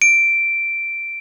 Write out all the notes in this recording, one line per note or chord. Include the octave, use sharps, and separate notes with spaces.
D7